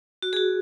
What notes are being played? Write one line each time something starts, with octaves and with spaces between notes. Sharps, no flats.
F#4
G#4
F#4